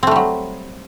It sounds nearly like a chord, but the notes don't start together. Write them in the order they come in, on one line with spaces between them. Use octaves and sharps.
C4 A3 G3 F#3